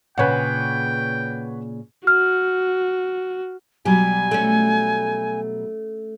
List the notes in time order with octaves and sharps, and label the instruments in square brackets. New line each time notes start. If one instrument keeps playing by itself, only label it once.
[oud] A#2 C#3 [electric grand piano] B4 C#5 F#5 [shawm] G5
[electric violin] F#4 [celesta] F6
[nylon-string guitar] B2 F#3 G3 [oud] G4 [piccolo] G#5
[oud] A3 C#4